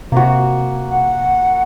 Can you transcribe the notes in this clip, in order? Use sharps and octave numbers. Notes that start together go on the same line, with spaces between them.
C3 A#3 F#4
F#5